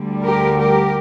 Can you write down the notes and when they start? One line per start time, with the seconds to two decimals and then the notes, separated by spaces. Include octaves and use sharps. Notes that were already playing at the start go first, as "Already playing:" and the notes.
Already playing: D2 D3 G3
0.24 G4 A#4
0.59 G4 A#4